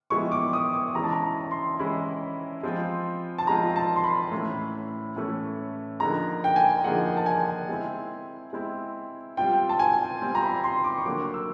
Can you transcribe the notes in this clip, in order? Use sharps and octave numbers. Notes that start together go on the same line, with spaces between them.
F3 G#3 B3 E4 C#6
D6
D#6
D6
E3 G#3 C#4 E4 A#5
A5
A#5
A#5
C6
E3 G#3 C#4 E4 B5
F3 G#3 C4 F4
A5
F3 G#3 C4 F4 A#5
A5
C6
B5
A2 E3 A3 C#4 E4
A2 E3 A3 C#4 E4
D3 F3 A#3 D#4 G#4 A#5
G5
G#5
D3 F3 A#3 D#4 G#4 F#5
A5
G#5
G#3 C4 E4
G#3 C4 E4
G3 C4 F4 G5
A5
G#5
G3 C4 F4
A#5
B5
C6
D6
C#6
D3 F#3 A#3 D6
E6